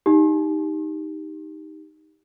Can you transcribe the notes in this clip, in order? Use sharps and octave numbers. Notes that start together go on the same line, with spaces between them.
D#4 G4